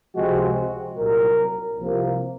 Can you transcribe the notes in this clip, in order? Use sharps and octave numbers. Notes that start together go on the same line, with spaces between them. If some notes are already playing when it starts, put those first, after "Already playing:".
C#2 C3 F3 G#3 C4 F#4
C2 A#2 F#3 A#4
C2 C3 F3 A#3